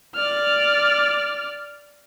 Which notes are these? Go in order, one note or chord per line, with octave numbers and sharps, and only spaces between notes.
D5 F6